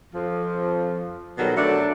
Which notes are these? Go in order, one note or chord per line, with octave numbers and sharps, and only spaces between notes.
F2 F3
B2 D#3 F#3 G3 A4
F#3 A3 D4